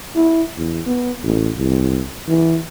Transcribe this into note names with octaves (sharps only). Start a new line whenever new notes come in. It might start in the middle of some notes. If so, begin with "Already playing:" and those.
E4
E2
B3
A1
C2
E3